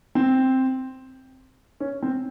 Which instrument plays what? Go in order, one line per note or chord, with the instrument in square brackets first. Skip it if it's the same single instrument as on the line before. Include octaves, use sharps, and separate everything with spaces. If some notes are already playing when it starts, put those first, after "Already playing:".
[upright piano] C4
C#4
C4